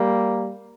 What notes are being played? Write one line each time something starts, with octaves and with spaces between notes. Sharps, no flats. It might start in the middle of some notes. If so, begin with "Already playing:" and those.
Already playing: G3 A#3